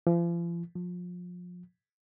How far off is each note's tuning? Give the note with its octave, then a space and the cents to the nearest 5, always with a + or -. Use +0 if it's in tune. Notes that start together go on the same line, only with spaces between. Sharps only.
F3 -40
F3 +30